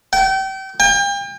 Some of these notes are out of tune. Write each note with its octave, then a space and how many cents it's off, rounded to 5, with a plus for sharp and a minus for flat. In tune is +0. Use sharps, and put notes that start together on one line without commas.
G5 -35
G5 +35